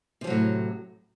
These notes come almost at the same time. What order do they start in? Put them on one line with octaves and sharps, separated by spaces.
C3 F3 F#3 A2